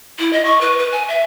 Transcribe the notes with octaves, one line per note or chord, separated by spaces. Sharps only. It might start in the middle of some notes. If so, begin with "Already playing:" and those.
E4
D#5
C#6
B4
B4
G#5
E5